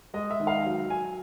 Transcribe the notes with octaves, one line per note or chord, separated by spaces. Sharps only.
G#3 D#5
E5
D#3
F5
F#3
F#3 G#5